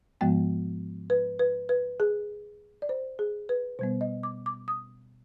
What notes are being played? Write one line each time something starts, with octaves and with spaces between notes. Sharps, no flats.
G#2 F3 G#3 B3 G5
B4
B4
B4
G#4
D5
C5
G#4
B4
B2 G3 B3 C5
D#5
D6
D6
D#6